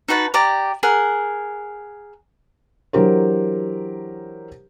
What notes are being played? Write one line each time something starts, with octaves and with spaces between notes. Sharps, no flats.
D#4 F#4 B4 A5
G4 D5 A#5 D6
G#4 A#4 F#5
E3 F#3 D4 G4 A#4 C5